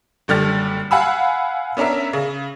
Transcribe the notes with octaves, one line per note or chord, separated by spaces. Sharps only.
F#1 D3 G3 F6 A6
F5 F#5 G#5 B5 E6
B3 C#4 D4 A#4 E5
C#3